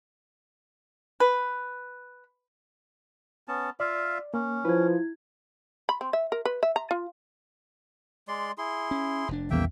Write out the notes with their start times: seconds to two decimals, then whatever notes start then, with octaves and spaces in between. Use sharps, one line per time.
1.20 B4
3.48 B3 C#4 A5
3.80 F4 D5 E5 F5
4.34 A#3 C#4
4.65 F3 E4 B4 G#6
5.89 B5
6.01 C4
6.13 E5
6.32 A#4
6.45 B4
6.63 E5
6.76 A#5
6.91 F4
8.28 G#3 D5 C6
8.58 E4 G#4 C6
8.91 C#4
9.28 F1 D4
9.51 A#1 E2 D#3 G3 A#3 C#4 E5 G5